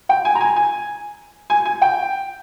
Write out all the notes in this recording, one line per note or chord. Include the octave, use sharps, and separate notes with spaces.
G5
G#5
A#5
G#5
G#5
G#5
G#5
G5